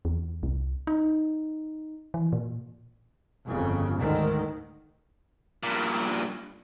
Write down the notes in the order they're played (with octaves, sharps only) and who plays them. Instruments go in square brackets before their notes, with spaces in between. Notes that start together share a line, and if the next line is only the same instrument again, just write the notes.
[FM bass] E2
C2
D#4
E3
A#2
[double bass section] G1 F2 C#3
D2 G#2 D3 D#3
[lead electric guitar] G2 A#2